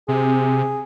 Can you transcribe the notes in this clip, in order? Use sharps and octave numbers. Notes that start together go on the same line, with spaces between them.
C3 G#4